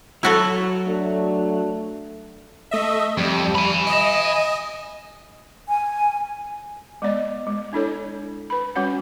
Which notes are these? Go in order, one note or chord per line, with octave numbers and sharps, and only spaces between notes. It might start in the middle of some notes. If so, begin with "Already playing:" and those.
F#3 E4 F#4 A4
A3 D4
A3 D#5 E5
F2 G3
G#5 B5
D#5
G#5
G#3 B3 D5 D#5
G#3
D4 E4 A4 C#5
B4 B5
G3 C#4 F#4 C#5 F#5